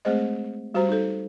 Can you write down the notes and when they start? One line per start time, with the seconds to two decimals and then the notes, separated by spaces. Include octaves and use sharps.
0.05 G#3 A3 C4 G#4 C5 D#5
0.74 G3 F#4 G4 C5 A#5
0.89 D#4 A4